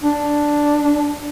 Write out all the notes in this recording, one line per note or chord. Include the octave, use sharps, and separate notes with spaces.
D4